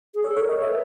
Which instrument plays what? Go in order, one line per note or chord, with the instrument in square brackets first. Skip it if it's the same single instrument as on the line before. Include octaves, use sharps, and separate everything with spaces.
[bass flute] G#4
[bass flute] A4 [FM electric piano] C#5
[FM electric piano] C#5
[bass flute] A#4
[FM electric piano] D#5
[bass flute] A4
[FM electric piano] E5
[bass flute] B4